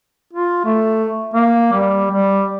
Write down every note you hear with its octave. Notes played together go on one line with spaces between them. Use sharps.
F4
A3
A#3
G3
G3